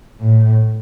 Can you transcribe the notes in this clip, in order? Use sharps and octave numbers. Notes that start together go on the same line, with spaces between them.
A2